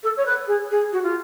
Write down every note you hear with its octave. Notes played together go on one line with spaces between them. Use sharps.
A4
C#5
B4
G#4
G#4
F#4
F4